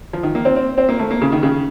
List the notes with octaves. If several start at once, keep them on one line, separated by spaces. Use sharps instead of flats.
F3
D#3
A#3
C4
C4
C4
A#3
A3
A#3
C#3
D#3
C#3